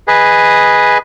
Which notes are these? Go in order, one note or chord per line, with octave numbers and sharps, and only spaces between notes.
G#4 B4 D#5